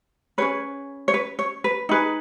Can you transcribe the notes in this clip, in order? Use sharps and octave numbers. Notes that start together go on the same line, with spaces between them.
C#4 G#4 B4 C#5
C#5
B4
C#5
B4
D#4 G#4 B4